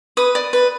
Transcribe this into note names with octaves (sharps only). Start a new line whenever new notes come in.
B4 D#6
D5
B4